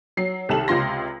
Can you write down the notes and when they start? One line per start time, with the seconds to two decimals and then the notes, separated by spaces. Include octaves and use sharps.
0.17 F#3 C7
0.49 C2 D#3 A4 E7 F#7
0.68 C#2 C3 F4 C6 A#6